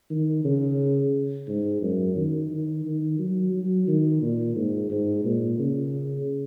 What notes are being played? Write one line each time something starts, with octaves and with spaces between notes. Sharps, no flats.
D#3
C#3
G#2
F#2
D#3
D#3
D#3
F#3
F#3
D#3
A#2
G#2
G#2
A#2
C#3